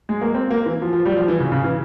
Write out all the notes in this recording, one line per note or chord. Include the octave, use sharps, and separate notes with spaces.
G#3
A#3
C4
A#3
E3
F3
F3
G3
F3
E3
C#3
C#3
E3